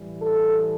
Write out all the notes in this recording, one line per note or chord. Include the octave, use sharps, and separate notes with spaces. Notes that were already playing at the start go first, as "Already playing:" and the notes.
Already playing: A2 E3 G3
A4